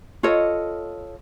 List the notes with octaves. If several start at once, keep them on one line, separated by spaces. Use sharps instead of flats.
F4 A4 C#5 D#5